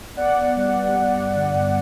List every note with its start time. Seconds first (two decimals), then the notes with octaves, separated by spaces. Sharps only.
0.17 B3 D5 F#5
0.37 B3
0.56 G3
0.75 G3
0.95 B3
1.14 G2
1.35 D3
1.54 G2